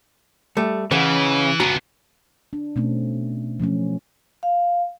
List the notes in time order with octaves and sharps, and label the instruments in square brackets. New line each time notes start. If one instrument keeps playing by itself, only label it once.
[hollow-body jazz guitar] G3 A3
[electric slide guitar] C#3 [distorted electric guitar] E3 [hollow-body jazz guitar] B4 D#5 F#5
[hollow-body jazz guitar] C#2 F#4 A#5 [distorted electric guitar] B3 D4
[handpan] D4
B2 A3 C4 C#4
F3 F#3 A3 C#4
[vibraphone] F5